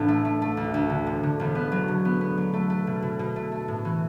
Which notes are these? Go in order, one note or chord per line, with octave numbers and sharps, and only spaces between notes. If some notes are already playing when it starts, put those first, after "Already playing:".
Already playing: A1 A2 D4
A3
A3
A3
D2
D2
D3
E1
D3
E1
B3
F#3
D3
B3
B3
F#3
A3
A3
B2
B2
B2
A3
A3
A2
E3